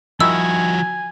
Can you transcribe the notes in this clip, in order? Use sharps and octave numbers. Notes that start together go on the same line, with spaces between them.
D#3 F3 E4 F#4 G#5 E6